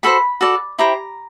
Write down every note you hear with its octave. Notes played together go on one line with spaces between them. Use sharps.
F#4 A4 C5 B5
F#4 A4 D5
E4 G4 C5 A#5